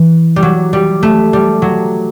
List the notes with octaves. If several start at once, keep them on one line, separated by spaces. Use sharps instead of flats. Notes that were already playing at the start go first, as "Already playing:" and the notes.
Already playing: E3
G3
F#3
G3
A3
G3
F#3